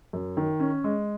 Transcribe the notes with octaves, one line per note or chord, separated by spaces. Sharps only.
F#2
D#3
C#4
G#3